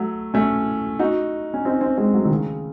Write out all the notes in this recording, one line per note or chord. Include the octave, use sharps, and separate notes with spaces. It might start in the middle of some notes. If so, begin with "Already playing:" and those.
Already playing: F#3 A3
A3 C#4
D#4 F#4
C#4
C4 D#4
C4 D#4
G#3 C4
F#3 A3
D#3
C#3